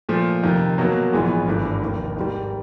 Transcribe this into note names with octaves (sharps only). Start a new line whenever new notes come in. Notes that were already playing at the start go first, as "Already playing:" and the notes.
A#2 F3 A3
F2 C3 D#3
B2 F#3 A#3
A#1 G#2 E3 G#3 B3
G#1 G2 E3 A3 D4
F1 D#2 D#3
G#2 D#3 G3